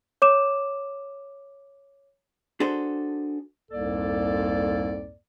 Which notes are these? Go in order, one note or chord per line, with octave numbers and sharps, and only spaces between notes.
C#5 D6 E7
D4 F#4 G#4 A4 C5
C2 F2 G#2 A#3 A4 D5